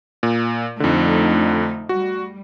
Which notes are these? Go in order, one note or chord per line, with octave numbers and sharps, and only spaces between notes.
A#2
F2 D3 F3 A3 D#4
G3 F#4